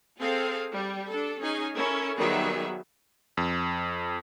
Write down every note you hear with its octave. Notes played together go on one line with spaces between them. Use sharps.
C4 G#4 A4 F5
G3
D4 A4
C#4 D#4 G#4 G#5
C#4 E4 A4 A#4
D#3 F#3 G3 B3 G#4 E5
F2